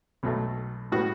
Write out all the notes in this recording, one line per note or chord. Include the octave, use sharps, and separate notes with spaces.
B1 B2 F#3 A3
A2 G3 B3 F#4